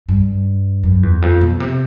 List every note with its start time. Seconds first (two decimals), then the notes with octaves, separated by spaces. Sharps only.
0.09 G2
0.83 F#2
1.03 E2
1.22 F2
1.41 B2
1.60 C3